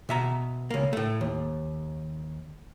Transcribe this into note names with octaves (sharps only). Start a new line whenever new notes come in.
B2 E5 A#5
C#2 A#3
A2 A3
D#2